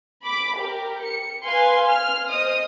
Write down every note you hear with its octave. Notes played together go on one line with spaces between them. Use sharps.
B5 D6
G4 A#4
C#7
B4 F5 G#5 C6
F6
C5 D#5 D#6